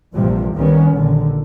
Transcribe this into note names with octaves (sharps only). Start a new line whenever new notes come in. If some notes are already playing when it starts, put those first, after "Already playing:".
A#1 G2 C3 E3 F3 G3
C2 D#3 G3 B3 C#4
A#1 D3 D#3